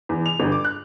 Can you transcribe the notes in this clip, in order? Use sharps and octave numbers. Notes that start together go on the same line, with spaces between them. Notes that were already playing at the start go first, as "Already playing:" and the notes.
E2
F7
G1
D6
F#6